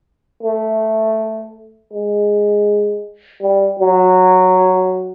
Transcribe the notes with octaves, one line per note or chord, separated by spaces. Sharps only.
A3
G#3
G3
F#3